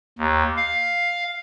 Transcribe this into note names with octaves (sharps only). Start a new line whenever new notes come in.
D#2
F5